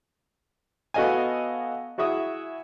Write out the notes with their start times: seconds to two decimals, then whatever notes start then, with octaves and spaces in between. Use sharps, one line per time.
0.94 B3 F#4 A4 D#5 F5 G#5
1.98 E4 F#4 G#4 E5 D#6